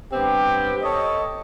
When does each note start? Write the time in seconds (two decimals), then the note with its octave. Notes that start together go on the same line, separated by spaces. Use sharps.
0.13 G2 B3 C4 G4
0.83 A4 C#5 D#5